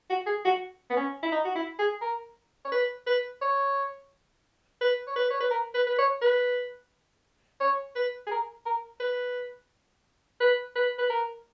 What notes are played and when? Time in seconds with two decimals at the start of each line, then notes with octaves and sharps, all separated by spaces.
0.10 F#4
0.27 G#4
0.45 F#4
0.90 B3
0.97 C#4
1.23 E4
1.32 D#4
1.45 F#4
1.56 E4
1.79 G#4
2.02 A#4
2.65 C#5
2.72 B4
3.07 B4
3.42 C#5
4.81 B4
5.07 C#5
5.16 B4
5.30 C#5
5.41 B4
5.51 A#4
5.74 B4
5.87 B4
5.98 C#5
6.22 B4
7.60 C#5
7.96 B4
8.27 G#4
8.31 A#4
8.66 A#4
9.00 B4
10.40 B4
10.76 B4
10.98 B4
11.10 A#4